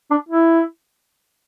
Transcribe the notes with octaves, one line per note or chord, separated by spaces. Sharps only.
D4
E4